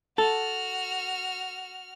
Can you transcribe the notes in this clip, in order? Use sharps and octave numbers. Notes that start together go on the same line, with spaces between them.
F#4 A4 F6